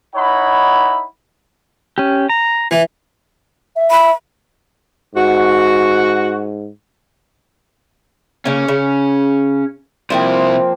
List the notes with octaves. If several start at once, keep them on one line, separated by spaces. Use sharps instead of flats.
D#4 E4 C#5 F#5 B5
C#4 G4
A#5
E3
E5
B5
G#2 F#4
C#3 A#3 C#4
C#3
C3 F3 A#3 C4 E4